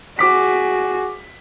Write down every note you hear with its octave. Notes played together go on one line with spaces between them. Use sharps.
F#4 G#4 D6 B6